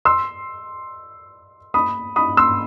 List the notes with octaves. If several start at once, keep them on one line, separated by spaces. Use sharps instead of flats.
C6 E6
B5 D#6
B5 D#6
C6 E6